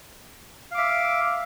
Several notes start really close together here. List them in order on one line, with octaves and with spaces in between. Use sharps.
F5 D6 E5